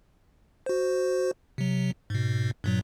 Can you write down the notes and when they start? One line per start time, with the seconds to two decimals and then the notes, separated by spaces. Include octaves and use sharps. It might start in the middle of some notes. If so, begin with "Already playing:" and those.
0.66 F#4 C5
1.58 C3 F#3
2.10 G#2 B2
2.64 G2 A#2 F#3